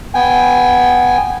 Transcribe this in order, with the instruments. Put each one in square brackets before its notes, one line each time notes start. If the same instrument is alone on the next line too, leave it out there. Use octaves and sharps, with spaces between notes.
[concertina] B3 G5 G#5